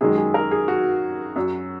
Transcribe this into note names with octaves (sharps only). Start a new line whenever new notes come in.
F#2 D#3 G#3 G#4
G#4
A#4
G#4
F#4
F#2 F#3